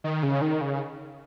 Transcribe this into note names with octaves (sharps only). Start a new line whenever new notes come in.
D#3
C#3
D#3
C#3